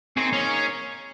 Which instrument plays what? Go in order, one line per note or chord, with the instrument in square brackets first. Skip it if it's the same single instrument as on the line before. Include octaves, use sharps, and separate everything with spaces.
[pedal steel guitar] A#3 D#4 G#4 C#5 [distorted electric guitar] C4
[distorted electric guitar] C#4